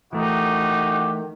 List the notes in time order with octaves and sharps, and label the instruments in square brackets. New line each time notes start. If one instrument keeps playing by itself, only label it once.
[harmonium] D#3 [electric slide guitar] E3 A3 [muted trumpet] D#4 [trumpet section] F#4 G4